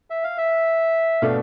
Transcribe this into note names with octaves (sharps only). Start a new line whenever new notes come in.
E5
F5
E5
B2 A3 D4 A4 F5